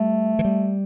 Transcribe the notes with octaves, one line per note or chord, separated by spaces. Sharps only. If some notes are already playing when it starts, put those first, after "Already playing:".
Already playing: G3 A3
E3
G3